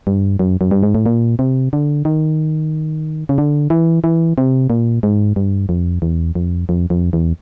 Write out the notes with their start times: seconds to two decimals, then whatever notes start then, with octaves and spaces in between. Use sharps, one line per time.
0.07 G2
0.39 F#2
0.61 F#2
0.71 G2
0.83 G#2
0.95 A2
1.06 A#2
1.39 C3
1.73 D3
2.05 D#3
3.29 C#3
3.38 D3
3.70 E3
4.04 E3
4.38 C3
4.70 A#2
5.03 G#2
5.36 G2
5.69 F2
6.02 E2
6.35 F2
6.69 F2
6.90 F2
7.13 E2